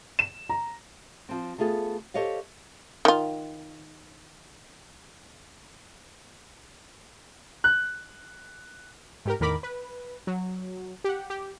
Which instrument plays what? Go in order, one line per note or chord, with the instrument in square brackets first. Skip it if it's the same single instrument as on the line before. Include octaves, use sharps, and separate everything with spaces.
[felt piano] E7
A#5
[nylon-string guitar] F3 C4
A3 B3 F4 G#4 A4
G4 A4 C5 C#5 D#5 F5
[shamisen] D#3 F4
[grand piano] F#6
[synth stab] G#2 G4 A#4
E2 A2 D#3 A#4 B5 D6
B4
F#3
G4 F#5
G4